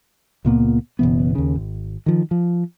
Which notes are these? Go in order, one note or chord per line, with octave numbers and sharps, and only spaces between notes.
C#2 A#2 A#3 B3
F#1 B2 E3 B3
D#2 C#3
G#1
D#3 F3
F3